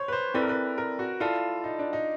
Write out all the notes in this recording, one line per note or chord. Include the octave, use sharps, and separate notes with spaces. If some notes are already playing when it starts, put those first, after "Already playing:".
Already playing: C5 C#5
B4
C5
C4 E4 A4 B4 D5
A#4
B4
A#4
F#4
E4 F4 A4 D5 F5 A5
D#4
D4
D#4